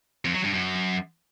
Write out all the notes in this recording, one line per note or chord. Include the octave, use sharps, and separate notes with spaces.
F2
F#3
G2
F#2